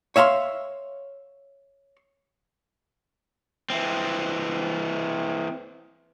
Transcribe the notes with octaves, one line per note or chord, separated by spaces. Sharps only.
C#5 E5 F5 A#5 C6
E3 C4